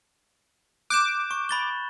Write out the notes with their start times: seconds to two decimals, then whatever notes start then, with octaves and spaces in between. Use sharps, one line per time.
0.90 D6 F#6 G6 E7
1.31 C#6
1.49 B5 A6 G7